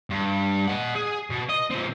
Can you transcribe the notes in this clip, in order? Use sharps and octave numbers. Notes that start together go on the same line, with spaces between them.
G2
D#5 F#5
G#4
B2
D#5
A#2 C4